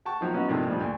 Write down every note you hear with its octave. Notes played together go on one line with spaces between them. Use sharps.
F#5 G5 A5 C#6
D#3 F3 F#3
F#3 B3 C#4 D#4 E4 F#4
G2 C3 D#3 F3 A3
G2 A#2 D#3 F3 G3
D2 G#5